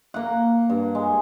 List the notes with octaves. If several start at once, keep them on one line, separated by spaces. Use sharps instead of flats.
A#3 F#5
G2
G#3